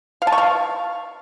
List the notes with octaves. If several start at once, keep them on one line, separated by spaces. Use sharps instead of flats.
F5
A5
C#6
F5